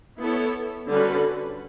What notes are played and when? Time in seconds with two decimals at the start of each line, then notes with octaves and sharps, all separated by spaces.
0.21 B3 E4 A4 C#5
0.89 D3 G3 C#4 F#4 B4